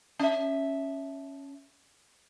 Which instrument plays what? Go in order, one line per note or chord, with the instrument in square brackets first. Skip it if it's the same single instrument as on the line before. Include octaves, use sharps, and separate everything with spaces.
[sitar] C#4 E5